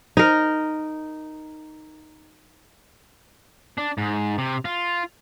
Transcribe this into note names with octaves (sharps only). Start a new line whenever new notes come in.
D#4 A#4
D4
G#2
C3
F4